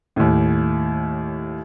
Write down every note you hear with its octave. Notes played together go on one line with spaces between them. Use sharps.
D#2 A2